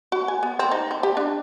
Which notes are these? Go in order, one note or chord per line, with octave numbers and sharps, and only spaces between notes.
F#4
G#5
B3
C4
D#4
C4
G4
D4